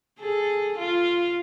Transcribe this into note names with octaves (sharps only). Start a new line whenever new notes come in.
G#4 A4
F4